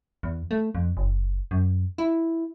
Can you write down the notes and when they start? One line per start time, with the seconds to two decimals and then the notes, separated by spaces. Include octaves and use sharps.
0.23 E2
0.51 A3
0.75 F2
0.97 F#1
1.51 F#2
1.98 E4